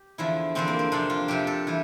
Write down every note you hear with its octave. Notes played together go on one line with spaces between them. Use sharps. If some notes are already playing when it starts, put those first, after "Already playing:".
Already playing: G4
E2 D3 F3 E4
E2 D3 F3 C4
A#3
C4
F2 C3 F3 D4
F4
F2 C3 F3 G4
A4
E3 G3